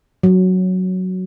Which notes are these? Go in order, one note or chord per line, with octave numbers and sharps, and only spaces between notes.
F#3